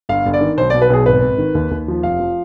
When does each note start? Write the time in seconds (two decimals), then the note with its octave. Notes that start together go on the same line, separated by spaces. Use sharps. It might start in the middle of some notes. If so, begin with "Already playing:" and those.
0.09 G1 F5
0.26 G1
0.34 D5
0.41 D#3
0.57 B1 C5
0.70 D5
0.74 B2
0.82 B4
0.90 B1 G#4
1.06 G#1 B4
1.23 G#1
1.38 D#3
1.55 D#2
1.71 D#2
1.88 F3
2.03 F1 F5
2.20 F3